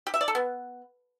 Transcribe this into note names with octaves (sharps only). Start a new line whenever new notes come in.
G4
E5
D5
A4
B3